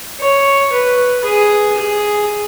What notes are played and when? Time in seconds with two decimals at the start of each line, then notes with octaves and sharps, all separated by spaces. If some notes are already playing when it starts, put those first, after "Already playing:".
0.20 C#5
0.73 B4
1.24 G#4
1.78 G#4